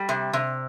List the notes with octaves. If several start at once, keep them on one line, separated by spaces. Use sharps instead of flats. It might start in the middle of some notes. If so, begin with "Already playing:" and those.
Already playing: G3
C3
C3